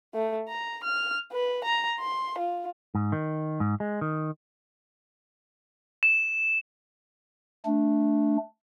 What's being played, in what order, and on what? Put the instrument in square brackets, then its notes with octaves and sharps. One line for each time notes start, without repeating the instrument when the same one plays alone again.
[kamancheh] A3
A#5
F6
B4
A#5
C6
F4
[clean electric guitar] G#2
D#3
G#2
G#3
D#3
[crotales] E7
[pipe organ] A3 D4